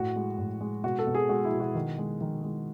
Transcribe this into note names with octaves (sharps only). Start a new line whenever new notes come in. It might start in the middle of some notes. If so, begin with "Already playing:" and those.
Already playing: A2 F#4
G#3
A2
G#3
B2 F#4
A4
B2
G#4
G#3 F#4
E4
B2
F#4
D#3
G#3
D#3
G#3